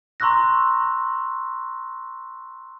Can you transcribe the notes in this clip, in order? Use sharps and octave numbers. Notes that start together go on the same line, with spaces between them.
A#5 C6 C#6 E6 F#6 A#6